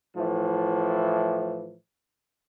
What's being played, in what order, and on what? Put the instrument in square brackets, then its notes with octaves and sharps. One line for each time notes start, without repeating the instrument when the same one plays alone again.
[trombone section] A2 E3 F3